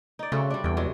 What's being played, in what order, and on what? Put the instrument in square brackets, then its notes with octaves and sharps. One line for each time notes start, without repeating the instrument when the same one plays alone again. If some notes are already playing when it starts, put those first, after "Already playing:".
[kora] D#4 D5
[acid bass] C#3 [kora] A3 C4 F#4
[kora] G3 D4
[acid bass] E2 [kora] G2 G5
[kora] C3 F#3 G#3